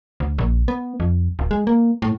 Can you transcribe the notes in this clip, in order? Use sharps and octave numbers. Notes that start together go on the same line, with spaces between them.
D2
A#1
B3
F2
D1
G#3
A#3
A2